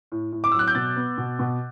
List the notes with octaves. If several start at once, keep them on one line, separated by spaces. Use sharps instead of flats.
A2
A2
D6
F#3 E6
F#6
G6
B2 A6
B3
B2
B2